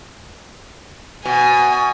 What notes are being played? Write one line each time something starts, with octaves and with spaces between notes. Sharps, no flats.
B2 G#5